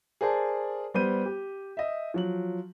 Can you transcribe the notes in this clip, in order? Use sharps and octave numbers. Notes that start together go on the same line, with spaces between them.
G#4 A#4 C5 D5 A5
G3 B3 C5 G6 D#7
G4
D#5 E5
F3 F#3 F#7